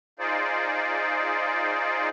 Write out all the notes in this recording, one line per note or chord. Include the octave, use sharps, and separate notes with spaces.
D#4 F4 G#4 C5 D5